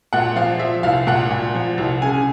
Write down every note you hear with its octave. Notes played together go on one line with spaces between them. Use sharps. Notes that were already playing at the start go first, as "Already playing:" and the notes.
A#2 F#5
F3 F5
F3 E5
C2 F5
A#2 F#5
A#2
F3
C2
C#3 G#5